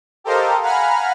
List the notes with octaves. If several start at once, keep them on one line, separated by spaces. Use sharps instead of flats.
G4 A4 A#4 C5 D#5 F5
F5 F#5 G#5 A#5 B5 F6